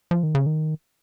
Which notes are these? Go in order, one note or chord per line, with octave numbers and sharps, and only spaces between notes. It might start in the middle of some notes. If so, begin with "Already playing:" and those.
F3
D#3
C#3
D#3